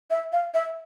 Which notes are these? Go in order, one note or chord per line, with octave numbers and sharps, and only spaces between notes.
E5
F5
E5